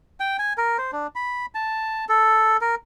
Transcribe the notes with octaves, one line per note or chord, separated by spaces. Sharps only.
G5
G#5
A#4
C5
D4
B5
A5
A4
A#4